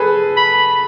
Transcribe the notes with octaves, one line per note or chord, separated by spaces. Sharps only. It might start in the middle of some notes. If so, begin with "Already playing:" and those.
Already playing: G#4 A4 B4
B5